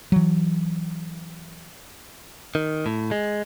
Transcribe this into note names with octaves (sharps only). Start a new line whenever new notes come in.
E3 F#3
D#3
A2
G#3